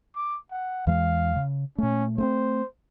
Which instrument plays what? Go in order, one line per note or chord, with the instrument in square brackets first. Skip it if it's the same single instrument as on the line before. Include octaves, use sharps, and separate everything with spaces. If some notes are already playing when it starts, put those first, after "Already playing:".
[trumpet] D6
F#5
[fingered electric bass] E2 E3 G#3 [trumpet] F5
[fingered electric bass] C#3
[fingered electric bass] A#2 A3 [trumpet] C#4
[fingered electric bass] A3 B3 C4 [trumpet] C5